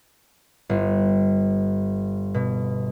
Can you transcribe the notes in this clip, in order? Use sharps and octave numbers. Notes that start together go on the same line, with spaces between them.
G1
B2